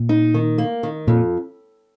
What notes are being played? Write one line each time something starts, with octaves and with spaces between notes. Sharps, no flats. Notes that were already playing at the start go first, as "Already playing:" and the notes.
Already playing: A#2
D#4
D#3
A#3
D#3
F2 A#2